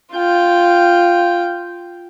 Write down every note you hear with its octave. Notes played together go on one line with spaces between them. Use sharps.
F4 G5